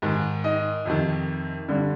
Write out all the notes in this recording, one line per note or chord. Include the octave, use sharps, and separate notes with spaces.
G#2 D#3
D#4 D#5
F2 C3 D#3
G2 D3